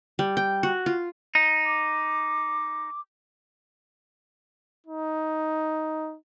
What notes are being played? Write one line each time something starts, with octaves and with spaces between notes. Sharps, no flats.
G3
G5
F#4
F4
D#4
D6
D#4